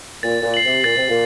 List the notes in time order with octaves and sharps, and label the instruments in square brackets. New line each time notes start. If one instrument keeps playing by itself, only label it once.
[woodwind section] A#2 [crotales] A6
[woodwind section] A#2
[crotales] C7 F#7
[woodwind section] C3
[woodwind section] A#2 [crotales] A6
[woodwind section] C3
A#2